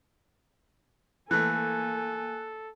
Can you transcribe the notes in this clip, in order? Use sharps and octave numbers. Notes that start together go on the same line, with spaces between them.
E3 A3 A#3 A4 G#5 F#6